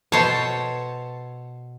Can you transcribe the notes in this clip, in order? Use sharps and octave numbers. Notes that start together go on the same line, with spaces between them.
B2 A4 C5 C#5 A5